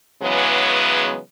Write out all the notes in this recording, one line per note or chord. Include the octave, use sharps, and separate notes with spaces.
C#3 E3 F#3 G#3 B3